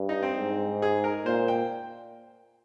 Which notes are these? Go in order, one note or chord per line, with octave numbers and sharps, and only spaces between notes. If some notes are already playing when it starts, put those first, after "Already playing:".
Already playing: G2
D#4
C4
G#2
G#4
A#4
A#2 C5
G5